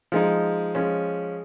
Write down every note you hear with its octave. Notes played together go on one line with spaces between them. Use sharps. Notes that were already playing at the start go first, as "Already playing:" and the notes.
F3 G#3 D#4
F3 G#3 C#4